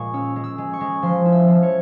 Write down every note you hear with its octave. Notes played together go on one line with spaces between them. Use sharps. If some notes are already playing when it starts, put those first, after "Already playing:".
Already playing: A#2 G#3 A#5 C#6
C#4 E6
G#3
E6
G#3
C#6
G#3
F3 C6
E4
E5
F3
C#5